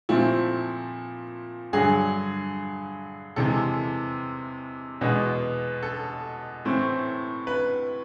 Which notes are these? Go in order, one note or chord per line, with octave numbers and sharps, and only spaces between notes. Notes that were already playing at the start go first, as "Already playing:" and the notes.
A#2 F3 A3 C4 E4
G2 D3 F#3 G#4
E2 C3 E3 G#3 A4
E2 B2 G#3 B3
A4
A2 E3 A3 C4
B4